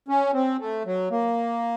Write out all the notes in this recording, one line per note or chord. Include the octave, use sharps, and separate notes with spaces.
C#4
C4
A3
F#3
A#3